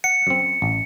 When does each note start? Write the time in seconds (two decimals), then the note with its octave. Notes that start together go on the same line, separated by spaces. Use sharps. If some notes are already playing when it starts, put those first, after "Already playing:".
0.04 F#5 C#7
0.27 F#2 C4
0.62 A1